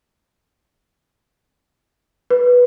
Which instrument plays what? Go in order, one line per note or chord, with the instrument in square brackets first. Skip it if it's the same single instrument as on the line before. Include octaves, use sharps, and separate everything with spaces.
[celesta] B4